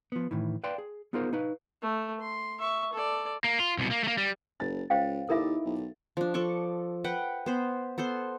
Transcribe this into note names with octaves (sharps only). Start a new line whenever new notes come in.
F3 B3
A2 D#3 E3
B4 D5 F5 G5 A5 C6
G#4
B3 D#4 F4 G#4 A#4 C5
D#4 B4 F5
A3 A4
C6
E5 C#6
A4 D5
A#3
F4
C2 B2
A#3
A3 A#3
G3
F#1 A6
C#2 C5 F5 G5
D#2 D#4 E4 A4 A#4 E5 D6
B1
F3 D4
F3 A4 D5 C#6
B4 F#5 G5
B3 C5 B5
B3 A4 C5 C6